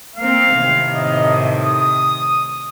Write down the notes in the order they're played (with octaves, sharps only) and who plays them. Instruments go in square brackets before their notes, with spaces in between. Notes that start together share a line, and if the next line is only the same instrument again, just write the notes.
[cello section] A#3 C4 [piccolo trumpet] F5
[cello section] A2 C3 D#3
[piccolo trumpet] D#5
D#6